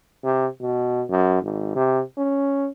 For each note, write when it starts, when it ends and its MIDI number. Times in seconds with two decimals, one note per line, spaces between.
0.24 0.47 48
0.61 1.03 47
1.09 1.39 42
1.42 1.73 32
1.76 2.01 48
2.17 2.68 61